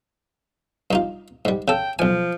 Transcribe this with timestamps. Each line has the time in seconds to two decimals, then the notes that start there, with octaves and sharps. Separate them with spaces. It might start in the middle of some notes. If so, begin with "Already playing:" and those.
0.91 G2 D#4 F4
1.45 G#2 G3
1.68 C#3 A4 G5
1.99 B1 F3 G#5